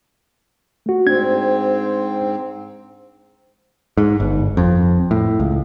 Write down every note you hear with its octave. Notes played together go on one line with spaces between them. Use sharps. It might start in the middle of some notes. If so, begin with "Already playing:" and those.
A3 F#4
G#2 C4 D4 G#6
G#2
G1
F2
A2
C#2